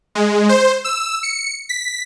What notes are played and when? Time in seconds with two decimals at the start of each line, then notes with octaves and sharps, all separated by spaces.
0.15 G#3
0.49 C5
0.84 E6
1.23 C#7
1.69 B6